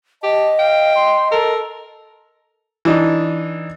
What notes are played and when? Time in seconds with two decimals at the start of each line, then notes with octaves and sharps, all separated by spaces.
0.23 G4 D#5 A5
0.59 F5 G5
0.96 C6
1.31 A4 A#4
2.85 E3 D4 D#4